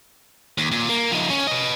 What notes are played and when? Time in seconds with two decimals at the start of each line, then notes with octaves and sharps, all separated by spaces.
0.58 D#2
0.72 A#2
0.89 A#3
1.12 F3 D#4
1.30 C#4
1.47 B4 D#5